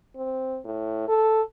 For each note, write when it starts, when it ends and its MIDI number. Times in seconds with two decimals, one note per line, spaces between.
0.16 0.59 60
0.65 1.07 45
1.08 1.42 69